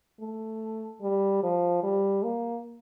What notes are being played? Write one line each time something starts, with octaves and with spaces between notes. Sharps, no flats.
A3
G3
F3
G3
A#3